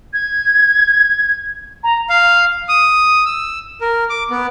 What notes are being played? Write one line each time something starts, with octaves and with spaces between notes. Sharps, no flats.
G#6
A#5
F5
D#6
E6
A#4
D6
B3